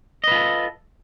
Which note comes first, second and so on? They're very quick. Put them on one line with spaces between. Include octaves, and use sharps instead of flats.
D#5 B4 F4 A4